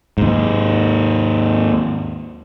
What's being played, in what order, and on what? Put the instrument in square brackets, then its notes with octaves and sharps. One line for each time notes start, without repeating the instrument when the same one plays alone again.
[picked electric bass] D#2 G#2